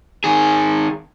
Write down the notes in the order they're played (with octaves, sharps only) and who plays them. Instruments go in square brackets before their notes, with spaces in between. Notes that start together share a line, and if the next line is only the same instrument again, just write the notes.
[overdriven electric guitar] D#3 G#4